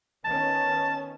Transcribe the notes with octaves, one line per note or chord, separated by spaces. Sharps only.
D#3 B3 C#4 A5